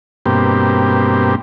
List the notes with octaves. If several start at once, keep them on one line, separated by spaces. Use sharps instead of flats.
G2 B2 A#3 C4 G4